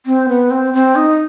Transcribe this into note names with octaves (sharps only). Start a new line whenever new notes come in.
C4
B3
C4
C4
D#4